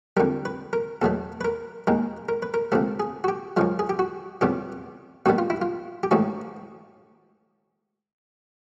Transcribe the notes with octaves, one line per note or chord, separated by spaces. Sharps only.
F2 D3 G3 A#4
B4
A#4
E2 B2 F#3 A3 A4
B4
A#4
D#2 D#3 G#3 A#4
A#4
B4
A#4
C#2 C3 F3 A3 A4
G#4
F#4
G4
F#2 C#3 F3 G#3 F4
G#4
G4
F#4
F2 C#3 E3 G3 B3 G4
A1 G2 D#3 G3 B3 F#4
F4
E4
F4
G4
A1 G#2 E3 A3 C#4 F#4